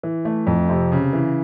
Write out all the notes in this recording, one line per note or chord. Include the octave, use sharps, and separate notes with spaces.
E3
A3
F2
C3
C#3
E3